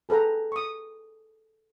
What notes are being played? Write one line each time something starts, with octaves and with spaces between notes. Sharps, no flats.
G#4 A4 B4 G5 A#5
C#6 D#6